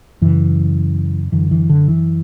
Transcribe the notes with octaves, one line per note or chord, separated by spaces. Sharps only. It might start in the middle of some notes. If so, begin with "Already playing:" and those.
F#2 C#3 E3
F#2 D3 E3
E3
D3
E3